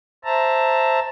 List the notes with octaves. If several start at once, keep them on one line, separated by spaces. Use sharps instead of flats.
C5 E5 A5 A#5